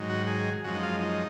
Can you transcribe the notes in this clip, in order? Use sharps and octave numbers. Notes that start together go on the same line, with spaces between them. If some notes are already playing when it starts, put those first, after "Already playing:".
Already playing: G#2 D#3 F#3
F#4
G#4
F#2 F3 G#3 F#4
D#4
F4
D#4